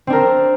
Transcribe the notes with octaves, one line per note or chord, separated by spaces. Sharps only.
C4 D4 A#4